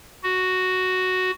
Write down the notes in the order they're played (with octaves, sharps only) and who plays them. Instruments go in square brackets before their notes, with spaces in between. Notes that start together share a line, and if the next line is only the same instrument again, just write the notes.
[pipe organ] F#4